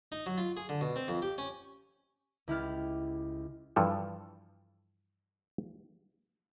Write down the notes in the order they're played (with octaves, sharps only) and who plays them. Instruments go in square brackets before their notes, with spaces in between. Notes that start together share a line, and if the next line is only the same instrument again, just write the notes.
[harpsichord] D#4
F#3
F4
G#4
D3
B2
C4
F2
G4
C#4
[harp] C#2 E4 G4 F6 A6
[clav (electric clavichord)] G2 E3 F3 A4